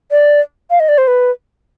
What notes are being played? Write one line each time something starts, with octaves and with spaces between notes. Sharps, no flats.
D5
F5
D#5
D5
C5
B4